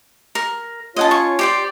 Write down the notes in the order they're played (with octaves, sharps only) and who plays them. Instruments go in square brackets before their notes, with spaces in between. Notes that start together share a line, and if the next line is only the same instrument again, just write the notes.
[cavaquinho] A#4
[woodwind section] C#4 F4 C#5 [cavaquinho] D#5 F#5 A5
[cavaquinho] C#6
G4 C5 D5